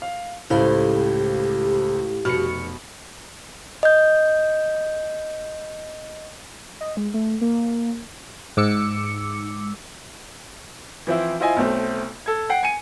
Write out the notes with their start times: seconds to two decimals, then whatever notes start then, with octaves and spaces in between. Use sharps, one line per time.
0.02 F5
0.50 C#2 A2 E4 G4 C5 F5
2.25 F1 B2 F#4 F6 C#7
3.83 D#5 G6
6.81 D#5
6.97 G#3
7.14 A3
7.41 A#3
8.57 G#2 D6 E6 C#7
11.07 E3 F3 C4 E4 C5
11.40 E4 F4 C5 D#5 E5 G#5
11.57 B1 A3 C4
12.26 A4 G#6
12.50 F#5 G5 C7 D7
12.63 G#5 C#7 D#7